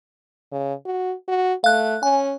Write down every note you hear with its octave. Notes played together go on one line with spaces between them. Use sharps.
C#3
F#4
F#4
A3 F5 F#6
C#4 G#5